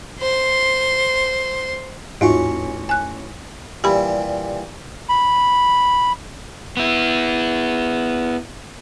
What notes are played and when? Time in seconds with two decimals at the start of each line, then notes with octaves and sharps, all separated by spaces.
0.19 C5 C6
2.21 A1 D#2 G#2 C#4 D#4 F4 F#4 C#6
2.89 G#5 F#6
3.84 A#2 E3 G3 G4 B5
5.09 B5
6.77 B3 E4